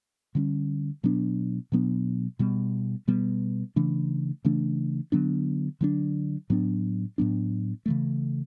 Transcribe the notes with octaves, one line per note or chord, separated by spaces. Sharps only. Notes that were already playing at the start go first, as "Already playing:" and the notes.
D3 G3 A#3 C#4
B2 F#3 B3 D4
B2 F#3 B3 D4
B2 G3 B3
B2 G3 B3
C#3 E3 A3 D4
C#3 E3 A3 D4
D3 F#3 B3 D4
D3 F#3 B3 D4
A2 F#3 B3 D4
A2 F#3 B3 D4
C#3 E3 A3